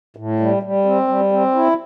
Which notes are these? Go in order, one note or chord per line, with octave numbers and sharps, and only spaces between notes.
A2
G3
G3
C4
G3
C4
E4